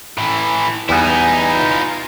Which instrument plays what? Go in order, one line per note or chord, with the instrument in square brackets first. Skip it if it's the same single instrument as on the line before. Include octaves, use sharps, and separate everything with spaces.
[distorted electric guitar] A2 E3
[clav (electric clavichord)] E2 G3 B3 [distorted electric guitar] D#4 E4 [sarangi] G#5
[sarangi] F4